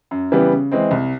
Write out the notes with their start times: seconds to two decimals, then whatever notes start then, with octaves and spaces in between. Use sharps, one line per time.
0.11 F#2
0.32 C#3 E3 G3 B3
0.52 C#3
0.72 E3 G#3 C4
0.91 C2